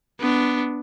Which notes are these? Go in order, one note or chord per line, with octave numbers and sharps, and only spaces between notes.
B3 D4